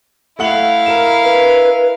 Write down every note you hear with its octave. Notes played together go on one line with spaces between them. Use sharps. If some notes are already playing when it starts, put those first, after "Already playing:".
A3 E4 F5 F#5 F#7
A#4 E7
B4